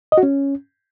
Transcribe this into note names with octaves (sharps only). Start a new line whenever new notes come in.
D#5
F#4
C#4